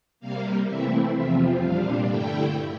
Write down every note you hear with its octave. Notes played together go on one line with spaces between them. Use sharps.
C3 G3 A#3 F5
E3 A3 C4 E4 E5
E2 C3 F3 C4 F4 E5
A#2 G3 D4 F5
G2 D3 A3 E4 G5